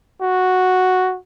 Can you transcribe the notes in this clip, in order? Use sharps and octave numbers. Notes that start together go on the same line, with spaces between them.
F#4